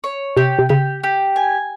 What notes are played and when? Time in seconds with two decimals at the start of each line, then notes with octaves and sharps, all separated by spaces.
0.04 C#5
0.37 C3 G4
0.59 C3
0.69 C#3 G4
1.03 G4
1.36 G#5